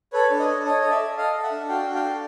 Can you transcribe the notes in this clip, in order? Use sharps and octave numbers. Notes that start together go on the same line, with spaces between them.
A4 B4 C#5
D4
C#5 D#5
A4
A4 C#5 D#5
A4 D#5
D5 E5
A4
A4 D#5 F5
A4
E5 F#5
D4
F#4 F5 G5
D4
F5 G5
A4